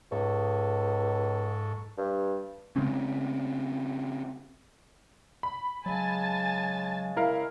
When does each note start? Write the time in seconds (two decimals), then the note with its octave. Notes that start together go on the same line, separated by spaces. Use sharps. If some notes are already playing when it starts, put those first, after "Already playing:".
0.12 C#2 G#2 A4 C#6
1.98 G2
2.76 C#3 G#3 C4 C#4
5.43 B5
5.86 C#3 F#3 G#3 G#5 A5 A6
7.17 E4 A#4 F5